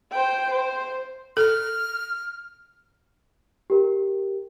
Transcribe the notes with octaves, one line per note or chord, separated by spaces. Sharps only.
C5 G5
C5
A4 F6
G4 A#4